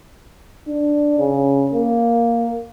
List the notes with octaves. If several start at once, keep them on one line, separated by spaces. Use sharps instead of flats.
D4
C#3
A#3